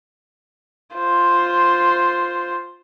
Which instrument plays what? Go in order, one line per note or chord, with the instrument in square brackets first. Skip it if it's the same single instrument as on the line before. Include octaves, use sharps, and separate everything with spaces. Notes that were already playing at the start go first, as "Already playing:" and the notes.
[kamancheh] F4 C5